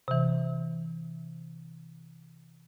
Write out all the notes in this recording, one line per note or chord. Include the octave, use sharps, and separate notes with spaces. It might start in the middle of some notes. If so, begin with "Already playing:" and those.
C3 E3